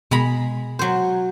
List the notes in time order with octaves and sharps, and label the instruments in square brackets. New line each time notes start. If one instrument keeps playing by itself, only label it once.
[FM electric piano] B2 [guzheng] G#3 A#5 B5
[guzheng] F#3 C5